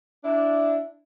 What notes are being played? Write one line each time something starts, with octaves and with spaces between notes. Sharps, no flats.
D4 E4